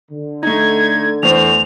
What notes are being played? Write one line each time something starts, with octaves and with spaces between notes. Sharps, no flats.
D3
A3 D#4 G#6
E2 A3 C5 F7